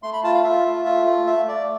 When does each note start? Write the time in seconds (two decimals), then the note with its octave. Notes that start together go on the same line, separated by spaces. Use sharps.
0.03 A3 C6
0.13 B5
0.23 F4 A5
0.34 F5
0.44 F4 E5
0.66 A3
0.85 F4
1.06 A3
1.27 A3 E5
1.48 A3 D5